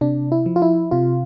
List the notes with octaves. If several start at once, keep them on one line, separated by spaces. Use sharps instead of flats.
C3 D4
E4
F3
F4
E4
C3 F4